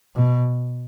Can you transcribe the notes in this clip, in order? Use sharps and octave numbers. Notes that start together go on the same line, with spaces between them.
B2